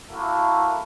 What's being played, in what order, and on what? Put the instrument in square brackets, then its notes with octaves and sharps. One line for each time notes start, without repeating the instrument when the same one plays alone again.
[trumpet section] A3 A#3 E4 F#4 A4 A#4